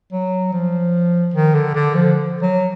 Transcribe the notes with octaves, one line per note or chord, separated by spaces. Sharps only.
F#3
F3
D#3
D3
D3
F3
F#3